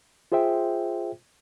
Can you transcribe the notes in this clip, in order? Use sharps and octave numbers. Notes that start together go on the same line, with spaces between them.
F4 G#4 C5 E5 G5